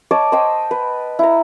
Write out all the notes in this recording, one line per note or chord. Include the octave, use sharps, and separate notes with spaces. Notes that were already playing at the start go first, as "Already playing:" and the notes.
C#5 D#5 A5 D6
C5 D#5 G5
B4
E4 A#5